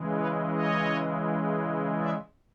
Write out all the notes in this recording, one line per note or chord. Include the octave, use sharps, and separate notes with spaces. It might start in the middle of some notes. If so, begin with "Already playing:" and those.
Already playing: C#3 E3 G#3
B4 C#5
C#5 D#5
D5 E5